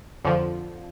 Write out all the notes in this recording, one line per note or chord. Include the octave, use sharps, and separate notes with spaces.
F2 D3 F3